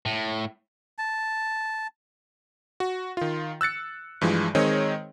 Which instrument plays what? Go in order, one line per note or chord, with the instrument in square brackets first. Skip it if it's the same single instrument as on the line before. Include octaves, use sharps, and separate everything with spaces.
[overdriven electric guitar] A2
[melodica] A5
[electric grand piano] F#4
D#3 F4
E6 F#6 A6 C#7
G2 E3 F3 G#3
D#3 G#3 C4 G#4 C#5 D#5